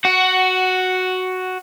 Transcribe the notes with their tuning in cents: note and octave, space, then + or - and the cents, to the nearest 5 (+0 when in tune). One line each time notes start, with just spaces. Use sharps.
F#4 +0 F#5 +15